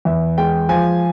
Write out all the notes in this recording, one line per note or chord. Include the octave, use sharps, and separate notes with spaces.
E2 E5
G#3 G5
F3 G#5